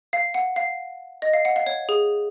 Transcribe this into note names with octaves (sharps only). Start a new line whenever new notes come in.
F5
F#5
F5
D#5
F5
F#5
F5
C#5
G#4